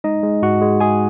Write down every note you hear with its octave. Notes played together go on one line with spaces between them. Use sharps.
G#3 D#4 D#5
G#3
G#2 F#4 F#5
G#3
G#3 G#4 G#5